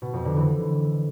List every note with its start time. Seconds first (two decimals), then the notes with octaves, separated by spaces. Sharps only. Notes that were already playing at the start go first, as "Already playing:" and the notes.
0.02 B2
0.13 F2
0.25 D3
0.37 E3